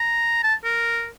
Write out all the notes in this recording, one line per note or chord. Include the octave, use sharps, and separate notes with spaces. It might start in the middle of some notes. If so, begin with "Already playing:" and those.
Already playing: A#5
A5
A#4